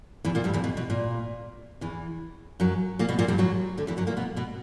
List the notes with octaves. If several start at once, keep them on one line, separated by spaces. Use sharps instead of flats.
E2 E3
A#2 A#3
G2 G3
E2 E3
B2
B2
A#2
E2 E3
F#2 F#3
A#2 A#3
B2 B3
A#2 A#3
G2 G3
F#2 F#3
D2 D3
E2 E3
F#2 F#3
A#2 A#3
B2 B3
B2 B3